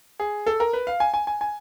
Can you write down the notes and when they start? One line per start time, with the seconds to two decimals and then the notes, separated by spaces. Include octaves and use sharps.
0.20 G#4
0.46 A4
0.60 A#4
0.73 B4
0.87 F5
1.00 G#5
1.14 G#5
1.27 G#5
1.41 G#5